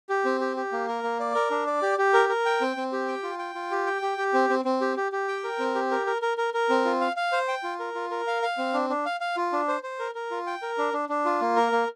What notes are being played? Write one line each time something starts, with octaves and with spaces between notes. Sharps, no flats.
G4
C4
G4
G4
A#3
A#4
A#3
D5
A#4
D4
D5
G4
G4
A#4
A#4
G5
C4
C4
G4
G5
F4
G5
F4
G4
G5
G4
G4
C4
C4
C4
G4
G4
G4
G5
A#4
C4
G4
A#4
A#4
A#4
A#4
A#4
C4
F4
F5
F5
C5
G5
F4
A#4
F4
A#4
F5
F5
C4
D4
D4
F5
F5
F4
D4
C5
C5
A#4
A#4
F4
G5
A#4
D4
D4
D4
F4
A#3
A#4
A#3